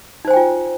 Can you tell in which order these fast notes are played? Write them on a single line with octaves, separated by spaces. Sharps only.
D#4 C5 G#5 G5 F4